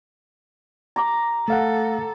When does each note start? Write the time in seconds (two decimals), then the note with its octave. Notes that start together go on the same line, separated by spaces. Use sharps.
0.96 A#5 D6
1.48 A3 A4 F5 F#5